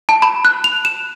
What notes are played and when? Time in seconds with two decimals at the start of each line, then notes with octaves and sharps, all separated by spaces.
0.09 A5
0.22 B5
0.45 F#6
0.64 F7
0.85 E7